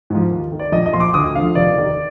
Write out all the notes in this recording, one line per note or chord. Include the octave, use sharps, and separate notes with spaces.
G#2 F3
D#2
D#3
D5
A#1 D#5
D#5
A#2 F3 C6
D6
D2 D#6
D3 F3 F5
F1 D5
D#2 D#3